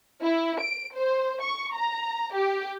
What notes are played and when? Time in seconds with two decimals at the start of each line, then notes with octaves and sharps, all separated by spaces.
0.22 E4
0.60 D7
0.95 C5
1.42 C#6
1.75 A#5
2.33 G4